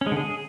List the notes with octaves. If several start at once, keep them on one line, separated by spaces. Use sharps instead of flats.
C#4
G#3
D3
G#4